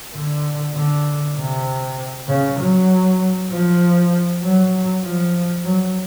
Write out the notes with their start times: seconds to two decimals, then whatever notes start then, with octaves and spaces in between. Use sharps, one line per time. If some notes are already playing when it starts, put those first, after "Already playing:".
0.14 D3
0.74 D3
1.36 C3
2.27 C#3
2.59 F#3
3.50 F3
4.43 F#3
5.03 F3
5.64 F#3